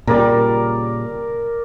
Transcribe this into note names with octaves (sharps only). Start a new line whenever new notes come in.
A#2 C#3 G3 A#4 D5